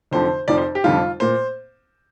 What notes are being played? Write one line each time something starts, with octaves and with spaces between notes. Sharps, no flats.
F1 F2 D3 F3 C5
F1 F2 F3 D5
C5
G4
F1 F2 D3 G3 F4
A#2 C5